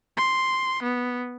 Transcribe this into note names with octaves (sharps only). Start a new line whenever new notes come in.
C6
B3